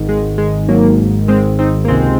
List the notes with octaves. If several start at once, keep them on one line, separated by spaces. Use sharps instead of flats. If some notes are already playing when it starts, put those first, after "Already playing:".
Already playing: G#1 G#2 D#3
G#3
G#3
F#3 A#3
G#3 C4
C4 D#4
A#3
C#2 C3 D#3 G#3 C4